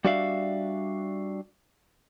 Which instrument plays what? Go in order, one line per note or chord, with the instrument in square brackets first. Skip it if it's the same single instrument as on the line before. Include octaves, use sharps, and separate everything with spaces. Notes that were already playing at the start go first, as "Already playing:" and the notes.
[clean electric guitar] G3 D4 F#4 D5 E5 F5